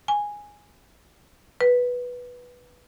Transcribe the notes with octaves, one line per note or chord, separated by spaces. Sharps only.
G#5
B4